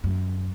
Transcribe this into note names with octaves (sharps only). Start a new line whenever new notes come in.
F#2